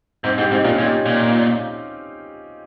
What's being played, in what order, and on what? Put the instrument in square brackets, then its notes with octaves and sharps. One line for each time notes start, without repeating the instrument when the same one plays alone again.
[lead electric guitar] G#2 [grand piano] C4 D#4
[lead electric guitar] G#2 [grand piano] D#4 G4
[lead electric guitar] G#2 [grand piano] C4 D#4
[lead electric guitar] A#2 [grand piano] C#4 F4
[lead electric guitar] A#2 [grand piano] D#4 G4
[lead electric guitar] A#2